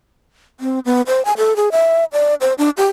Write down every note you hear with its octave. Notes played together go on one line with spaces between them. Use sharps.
C4
B3
C5
G#5
A4
G#4
E5
D5
C5
D4
G4